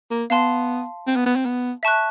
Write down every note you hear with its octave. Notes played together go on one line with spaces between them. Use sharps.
A#3
B3 F5 A5 C6
C4
B3
B3
C4
B3
E5 A5 C#6 F#6